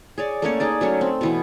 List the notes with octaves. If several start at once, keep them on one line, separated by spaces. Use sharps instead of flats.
G#4 C#5 D5
A3 A#3 C#4 C#5
D#4 G#4 D5
F#3 A3 C#4
C4
B2 E3 B3